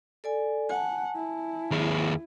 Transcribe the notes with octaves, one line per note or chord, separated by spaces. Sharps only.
A4 D5 G#5
F#5 G#5 A5
E4
D#2 G#4